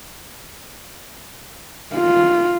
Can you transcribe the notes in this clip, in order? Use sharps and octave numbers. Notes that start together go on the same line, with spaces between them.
F4